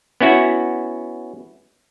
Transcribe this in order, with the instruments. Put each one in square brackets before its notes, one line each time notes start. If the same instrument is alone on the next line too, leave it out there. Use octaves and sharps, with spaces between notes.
[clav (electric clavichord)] B3 C#4 E4 F#4